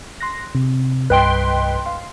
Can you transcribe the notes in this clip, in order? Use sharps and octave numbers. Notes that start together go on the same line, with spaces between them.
C6 F#6 A#6
C3
C2 G2 B4 D#5 G5 C6
F5 C6